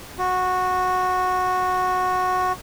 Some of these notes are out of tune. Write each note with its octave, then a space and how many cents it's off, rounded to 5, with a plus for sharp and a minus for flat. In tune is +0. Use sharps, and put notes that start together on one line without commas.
F#4 -10